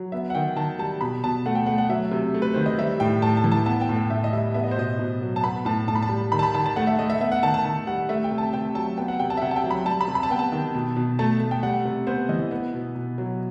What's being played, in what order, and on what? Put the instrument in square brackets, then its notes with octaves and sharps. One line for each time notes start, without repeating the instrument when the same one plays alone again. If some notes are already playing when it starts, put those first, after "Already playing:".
Already playing: [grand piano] F#3
B3 E5
F#5
D#3 G5
D#3 A5
G3 A5
B2 B5
B2 A5
A3 F#5
G5
A3 F#5
F#5
F#3 E5
C3
A3
B4
D#3 C5
D#5
G3 E5
A2 G5
A2 A5
A5
E3
A5
B3 A5
G5
A2
G5
A2 E5
D#5
G3 E5
B3 E5
D#5
C5
B2 D#5
B2
F#3
A5
B3 B5
A2 A5
A2 A5
B5
A5
G3
D#3 B5
A5
B5
D#3 A5
A5
A3 F#5
E5
A3 D#5
E5
B3 E5
F#5
D#3 A5
A5
D#3 A5
G3 F#5
A3 E5
G5
C3
A5
C3 G5
F#3 A5
B3 G5
F#5
C3 G5
A5
E5
C3 F#5
A5
G5
F#3
B5
G3 A5
B5
C3
B5
A5
B3 G5
A5
D#3
B2
B2
A3 A5
A3
G5
G3 F#5
C3
B3 C5
E3 D#5
B3
B2
B2
F#3